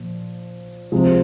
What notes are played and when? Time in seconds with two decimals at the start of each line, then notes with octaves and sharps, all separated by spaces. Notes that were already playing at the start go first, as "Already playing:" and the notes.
Already playing: A#2 F3
0.92 C3 F3 G#3